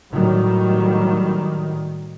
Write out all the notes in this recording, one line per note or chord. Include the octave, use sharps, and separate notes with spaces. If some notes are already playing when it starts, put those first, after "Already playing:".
A2 D#3 F#3 G3